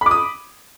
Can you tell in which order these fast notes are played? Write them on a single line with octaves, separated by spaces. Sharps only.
B5 D6 D#6